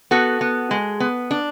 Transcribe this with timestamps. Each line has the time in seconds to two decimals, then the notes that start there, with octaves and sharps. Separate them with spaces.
0.11 B3 F#4 A4
0.41 B3
0.71 G#3
1.00 B3
1.31 D4